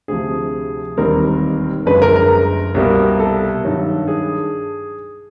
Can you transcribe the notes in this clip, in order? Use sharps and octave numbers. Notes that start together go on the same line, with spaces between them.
D2 C3 F3 G#4
E1 D#2 D#3 G3 C4 A#4
G1 F#2 C#3 F3 G#3 B4
A#4
A#4
C2 B2 G3 A#3
A4
G2 D#3 F#3
G#4